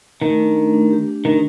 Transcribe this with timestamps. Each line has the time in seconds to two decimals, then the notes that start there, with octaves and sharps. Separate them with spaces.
0.21 D#3 A3
0.39 D4
0.56 A3
0.74 D4
0.91 G4
1.08 D4
1.25 D#3 D4